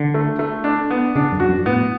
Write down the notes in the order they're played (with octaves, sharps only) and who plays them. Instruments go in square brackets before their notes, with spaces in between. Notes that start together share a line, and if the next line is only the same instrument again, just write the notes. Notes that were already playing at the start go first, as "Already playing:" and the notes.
Already playing: [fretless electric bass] D3
[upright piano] A3
A3
D4
B3
[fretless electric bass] C#3 [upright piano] D4
[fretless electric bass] F#2
[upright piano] F#4
[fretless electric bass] F#2
[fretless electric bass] A2 [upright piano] B3